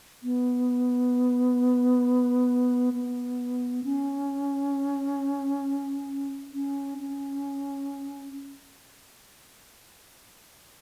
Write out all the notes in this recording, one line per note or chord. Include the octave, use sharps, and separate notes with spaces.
B3
B3
C#4
C#4
C#4